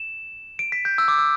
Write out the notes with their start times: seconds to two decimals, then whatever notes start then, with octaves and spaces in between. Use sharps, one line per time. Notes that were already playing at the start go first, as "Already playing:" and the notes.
Already playing: E7
0.59 D7
0.72 B6
0.85 G6
0.98 E6
1.08 D6
1.19 E6